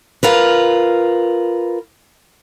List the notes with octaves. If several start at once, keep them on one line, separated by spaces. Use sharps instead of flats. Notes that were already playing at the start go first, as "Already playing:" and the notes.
F4 A#4 B4